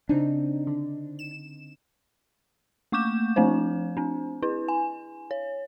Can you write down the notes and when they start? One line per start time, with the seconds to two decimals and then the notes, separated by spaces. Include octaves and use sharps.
0.09 C#3 C4 D4 D#4
0.67 D3
1.19 E7
2.92 A3 A#3 C#6 D6 G6 E7
3.36 F3 A3 C4 D4 C5
3.97 C4 D4
4.42 E4 B4
4.68 G#5
5.31 C#5